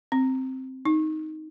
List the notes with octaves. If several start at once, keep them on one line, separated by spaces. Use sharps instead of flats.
C4
D#4